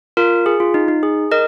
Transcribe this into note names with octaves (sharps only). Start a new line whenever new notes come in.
F4 A#4
G#4
F4
D#4
D#4
G#4
A#4 D#5